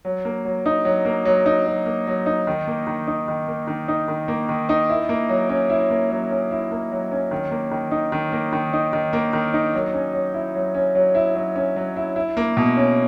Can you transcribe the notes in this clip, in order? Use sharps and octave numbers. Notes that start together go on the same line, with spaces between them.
F#3
A#3
F#3
D#4
F#3
A#3
F#3
D#4
F#3
A#3
F#3
D#4
D#3
A#3
D#3
D#4
D#3
A#3
D#3
D#4
D#3
A#3
D#3
D#4
E4
A#3
F#3
C#4
E4
A#3
F#3
C#4
E4
A#3
F#3
C#4
D#3
A#3
D#3
D#4
D#3
A#3
D#3
D#4
D#3
A#3
D#3
D#4
F#3
C#4
F#3
E4
F#3
C#4
F#3
E4
F#3
C#4
F#3
E4
E4
A#3
B2
C#4